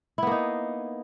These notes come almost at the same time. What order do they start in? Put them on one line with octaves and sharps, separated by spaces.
E4 B3 A#3 D#4